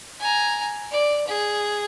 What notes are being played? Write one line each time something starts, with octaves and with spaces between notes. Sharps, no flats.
G#5 A#5
D5
G#4